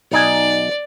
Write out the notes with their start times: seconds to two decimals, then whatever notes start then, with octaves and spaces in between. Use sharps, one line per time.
0.12 B1 D#4 D5 G#5